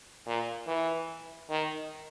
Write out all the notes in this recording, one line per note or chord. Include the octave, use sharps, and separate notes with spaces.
A#2
E3
D#3